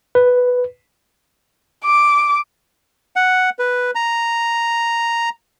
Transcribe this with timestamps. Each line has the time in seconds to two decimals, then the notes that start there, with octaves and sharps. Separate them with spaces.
0.15 B4
1.84 D6
3.16 F#5
3.59 B4
3.95 A#5